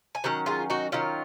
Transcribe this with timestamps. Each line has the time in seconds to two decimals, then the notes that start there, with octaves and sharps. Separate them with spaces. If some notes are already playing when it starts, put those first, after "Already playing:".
0.15 G#5
0.24 D#3 F#3 C#4 F#5
0.46 F4 G#4
0.70 D#4 F#4
0.92 D#3 F#3 C#4 F4